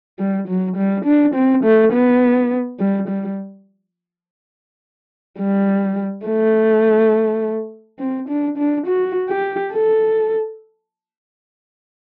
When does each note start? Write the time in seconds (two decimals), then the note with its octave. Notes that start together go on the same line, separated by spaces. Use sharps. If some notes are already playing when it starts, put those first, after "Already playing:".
0.19 G3
0.48 F#3
0.77 G3
1.05 D4
1.35 C4
1.64 A3
1.93 B3
2.79 G3
3.08 G3
5.39 G3
6.26 A3
7.99 C4
8.29 D4
8.58 D4
8.86 F#4
9.30 G4
9.73 A4